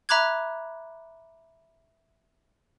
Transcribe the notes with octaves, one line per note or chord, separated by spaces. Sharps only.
E5 A#5 B5 D6 F#6 G#6